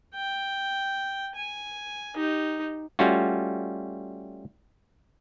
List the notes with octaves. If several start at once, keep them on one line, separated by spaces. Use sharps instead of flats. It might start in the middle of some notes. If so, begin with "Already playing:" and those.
G5
G#5
D#4 G4
G3 A3 C#4 F4 F#4